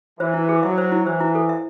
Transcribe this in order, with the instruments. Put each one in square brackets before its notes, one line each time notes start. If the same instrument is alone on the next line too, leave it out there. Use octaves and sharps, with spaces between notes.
[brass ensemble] E3 [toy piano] C5
[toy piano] E4
G#4
[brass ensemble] F#3 [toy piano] E5
[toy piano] C5
E4
[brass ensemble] E3 [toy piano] C5
[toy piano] E4
A4
E5